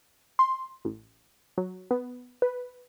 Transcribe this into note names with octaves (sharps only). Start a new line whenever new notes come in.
C6
A1
F#3
B3
B4